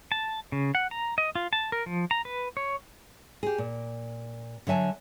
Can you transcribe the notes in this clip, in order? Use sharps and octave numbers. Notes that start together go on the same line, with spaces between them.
A5
C#3
F#5
A#5
D#5
F4
A5
A#4
F3
A#5
B4
C#5
G4 G#4
A#2
D3 F#3 E5 G#5 A5